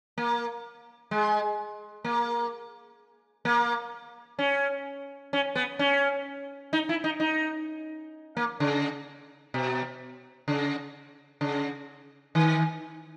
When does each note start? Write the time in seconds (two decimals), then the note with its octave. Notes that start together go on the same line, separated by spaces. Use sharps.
0.18 A#3
1.11 G#3
2.05 A#3
3.45 A#3
4.39 C#4
5.33 C#4
5.56 B3
5.79 C#4
6.73 D#4
6.89 E4
7.04 D#4
7.20 D#4
8.37 A#3
8.60 C#3
9.54 B2
10.48 C#3
11.41 C#3
12.35 D#3